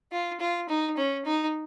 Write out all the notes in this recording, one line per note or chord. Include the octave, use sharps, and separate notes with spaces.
F4
F4
D#4
C#4
D#4